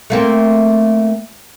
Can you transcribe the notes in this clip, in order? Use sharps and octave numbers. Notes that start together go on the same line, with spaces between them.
A3 A#3 C4